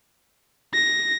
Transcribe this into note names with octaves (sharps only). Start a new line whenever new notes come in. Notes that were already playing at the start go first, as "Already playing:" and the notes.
A#6